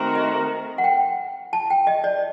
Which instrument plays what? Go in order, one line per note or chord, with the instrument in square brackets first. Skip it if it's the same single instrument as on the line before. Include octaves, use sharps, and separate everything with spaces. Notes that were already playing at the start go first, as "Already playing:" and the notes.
Already playing: [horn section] D#3 A3 C4 F#4 A#4
[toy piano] D#5
F#5
G5
A5
G5
D#5
D5